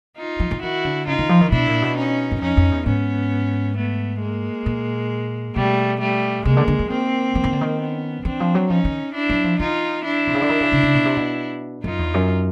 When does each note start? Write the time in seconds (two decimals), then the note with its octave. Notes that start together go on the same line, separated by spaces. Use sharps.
0.17 D#4 F4
0.40 F3
0.51 E3
0.62 D#3 E4 F#4
0.85 D3
1.07 C#3 D#4 F4
1.19 D#3
1.29 F3
1.41 D#3
1.51 B2 D4 E4
1.67 A#2
1.82 B2
1.96 C#4 D#4
2.31 F#2
2.41 F2 C#4 D#4
2.57 F2
2.72 E2
2.86 G#2 B3 C#4
3.77 A3 B3
4.21 G#3 A#3
4.66 A#2
5.55 B2 G3 A3
6.00 G3 A3
6.45 C3 G#3 A#3
6.57 D3
6.68 D3
6.79 F3
6.90 D#3 A#3 C4
7.35 E3
7.44 D#3
7.53 D3
7.61 D#3
7.80 B3 C#4
8.25 E3 C4 D4
8.40 F3
8.55 F#3
8.69 F3 C#4 D#4
8.85 D#3
9.14 D4 E4
9.30 F#3
9.44 F3
9.60 E3 D#4 F4
10.05 D4 E4
10.27 C3
10.34 C#3
10.42 D3
10.49 D#3
10.61 C#3
10.72 C#3
10.83 C#3
10.95 B2
11.06 C3
11.17 B2
11.84 F#2 D#4 F4
11.99 E2
12.14 F#2